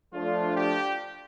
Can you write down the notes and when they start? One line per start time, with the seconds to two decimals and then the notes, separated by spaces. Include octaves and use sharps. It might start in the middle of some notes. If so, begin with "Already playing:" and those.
0.13 F3 A3 D4 F4
0.55 G4